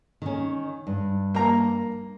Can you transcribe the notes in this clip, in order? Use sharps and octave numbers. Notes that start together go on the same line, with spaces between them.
D#3 C#4
G2
A#3 A#5